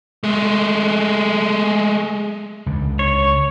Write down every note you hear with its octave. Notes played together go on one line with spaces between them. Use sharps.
G#3 A3
C#2 D3
C#5